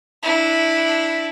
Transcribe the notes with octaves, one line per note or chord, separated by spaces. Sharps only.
D4 E4